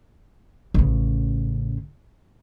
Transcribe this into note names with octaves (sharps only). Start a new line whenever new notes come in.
A1 C#3